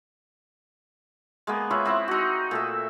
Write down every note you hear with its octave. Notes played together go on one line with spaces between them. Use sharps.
G#3 A#3 B3
F4 B4 C#5 E5
C4 E4 F#5
D#4 F#4
A#2 A3 E5